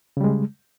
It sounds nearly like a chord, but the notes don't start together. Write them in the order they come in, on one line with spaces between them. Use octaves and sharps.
C#3 G3 G#3